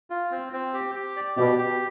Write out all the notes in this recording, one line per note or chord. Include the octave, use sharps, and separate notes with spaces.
F4
C4
C4
G4
G4
D5
B2 G4
G4